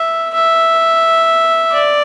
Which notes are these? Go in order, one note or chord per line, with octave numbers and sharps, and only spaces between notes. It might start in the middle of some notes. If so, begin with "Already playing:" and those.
Already playing: E5
E5
D5